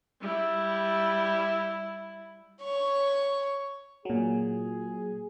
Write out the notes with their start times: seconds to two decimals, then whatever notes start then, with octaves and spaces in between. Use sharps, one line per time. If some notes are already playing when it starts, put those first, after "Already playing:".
0.21 G3 E4
2.62 C#5 C#6
4.05 A#2 F#3 G#4